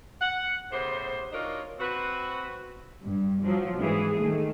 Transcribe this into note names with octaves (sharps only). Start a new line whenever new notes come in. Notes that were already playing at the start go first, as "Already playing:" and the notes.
F#5
A2 C#3 B3 G4 C5
D4 D#4 F4 F#4 A#4 C#5
C4 F#4 B4
G2
F3 F#3
G#2 E3 G#4
D#3 A3